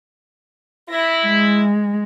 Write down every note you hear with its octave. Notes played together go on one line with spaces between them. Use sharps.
E4 A#6
G#3